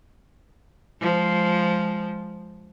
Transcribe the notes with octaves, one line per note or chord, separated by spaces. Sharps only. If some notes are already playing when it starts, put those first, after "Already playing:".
F3 G#3